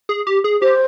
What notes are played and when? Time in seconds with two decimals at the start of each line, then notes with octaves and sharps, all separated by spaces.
0.09 G#4
0.27 G4
0.44 G#4
0.62 G4 C5